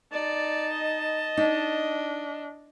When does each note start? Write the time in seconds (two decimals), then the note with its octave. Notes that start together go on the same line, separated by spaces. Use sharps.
0.12 D#4 D5 A5
0.73 D#5
1.37 D4 D#4